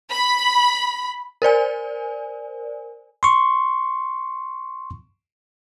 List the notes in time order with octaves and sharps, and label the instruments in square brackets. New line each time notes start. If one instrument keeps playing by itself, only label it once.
[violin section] B5
[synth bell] A#4 C5 D5 G#5
[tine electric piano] C6 C#6